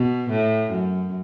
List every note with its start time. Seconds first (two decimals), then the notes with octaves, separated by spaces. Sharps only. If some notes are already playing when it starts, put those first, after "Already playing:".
Already playing: B2
0.29 A2
0.70 F#2